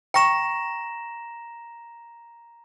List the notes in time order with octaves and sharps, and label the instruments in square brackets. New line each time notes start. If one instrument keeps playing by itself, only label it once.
[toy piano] G5 C#6 [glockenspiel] A#5 A#6 E7